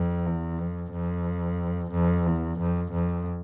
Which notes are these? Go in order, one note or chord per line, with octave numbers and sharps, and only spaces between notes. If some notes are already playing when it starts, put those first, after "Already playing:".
Already playing: F2
E2
F2
F2
F2
E2
F2
F2